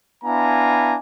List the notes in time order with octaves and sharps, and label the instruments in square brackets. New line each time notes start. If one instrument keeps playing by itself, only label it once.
[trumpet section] B3 D4 E4 F5 G#5 A#5